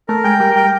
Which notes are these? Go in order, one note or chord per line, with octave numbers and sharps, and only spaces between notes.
A3 A#4
G#3 G5
G3 A#4
G3 G5